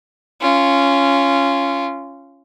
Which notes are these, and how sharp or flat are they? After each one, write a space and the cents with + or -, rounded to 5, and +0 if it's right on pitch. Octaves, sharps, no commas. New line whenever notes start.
C#4 +0 F4 -20